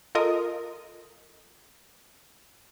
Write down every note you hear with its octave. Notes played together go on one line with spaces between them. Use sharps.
F4 A4 A#4 D#5 D#6